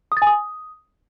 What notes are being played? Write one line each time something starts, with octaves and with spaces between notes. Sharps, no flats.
D#6
A6
G#5
D#6